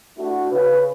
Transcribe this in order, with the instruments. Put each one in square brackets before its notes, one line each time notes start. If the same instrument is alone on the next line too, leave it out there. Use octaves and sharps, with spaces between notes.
[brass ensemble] A3 D4 E4 F#4
C#3 B4